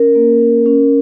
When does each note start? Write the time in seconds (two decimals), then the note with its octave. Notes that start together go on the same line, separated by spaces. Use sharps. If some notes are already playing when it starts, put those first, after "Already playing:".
Already playing: C#4 A#4
0.15 A#3
0.41 C#4
0.66 C#4